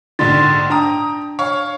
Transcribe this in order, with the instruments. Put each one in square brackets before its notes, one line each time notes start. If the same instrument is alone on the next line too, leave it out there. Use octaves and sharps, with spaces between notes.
[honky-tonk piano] A#1 G#2 D3 [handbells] C6 A6
[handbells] D4 [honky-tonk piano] G5 A#5 D#6
[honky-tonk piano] C#5 F5